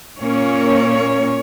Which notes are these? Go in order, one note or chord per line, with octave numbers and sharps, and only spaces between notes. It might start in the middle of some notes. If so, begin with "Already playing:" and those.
A#2 A#3 C#4 C#5